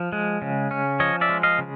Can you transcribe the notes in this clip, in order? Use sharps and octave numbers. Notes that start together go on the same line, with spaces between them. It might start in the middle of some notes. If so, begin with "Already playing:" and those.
Already playing: F3
G#3
C#3
C#4
F3 C#5 D#5
D5 E5
G#3
D#5 F5
C#3